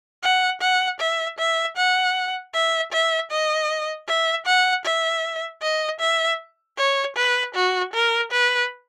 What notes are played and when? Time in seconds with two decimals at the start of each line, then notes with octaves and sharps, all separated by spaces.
0.23 F#5
0.61 F#5
1.00 E5
1.39 E5
1.77 F#5
2.54 E5
2.92 E5
3.31 D#5
4.08 E5
4.46 F#5
4.85 E5
5.62 D#5
6.00 E5
6.77 C#5
7.16 B4
7.55 F#4
7.94 A#4
8.32 B4